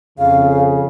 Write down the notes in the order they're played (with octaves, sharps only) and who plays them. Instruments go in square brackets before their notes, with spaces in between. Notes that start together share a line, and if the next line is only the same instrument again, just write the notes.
[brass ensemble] F2 C#3 [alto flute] F5